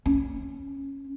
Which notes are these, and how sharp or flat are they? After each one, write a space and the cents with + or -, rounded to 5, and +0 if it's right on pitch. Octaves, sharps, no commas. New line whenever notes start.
C#4 -10